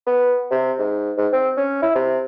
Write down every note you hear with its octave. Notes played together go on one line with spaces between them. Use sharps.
B3
C3
G#2
G#2
C4
C#4
E4
C3